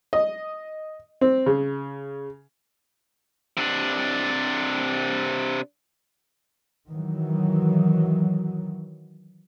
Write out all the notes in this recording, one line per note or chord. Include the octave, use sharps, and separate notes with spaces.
D#5
C4
C#3
C3 D4
D#3 E3 F#3